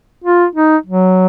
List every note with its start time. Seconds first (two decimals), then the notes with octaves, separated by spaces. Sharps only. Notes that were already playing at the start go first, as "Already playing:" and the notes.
0.24 F4
0.55 D#4
0.86 F#3